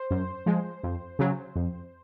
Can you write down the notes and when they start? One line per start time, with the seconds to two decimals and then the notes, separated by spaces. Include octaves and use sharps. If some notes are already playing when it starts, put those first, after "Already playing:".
Already playing: C5
0.11 F#2
0.46 F3 G#3
0.83 F2
1.19 C#3 F#3
1.55 F2